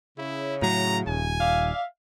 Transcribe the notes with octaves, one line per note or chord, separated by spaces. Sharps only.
C#3 E4
A2 F#3 A#5
D#1 G#5
D5 E5 F5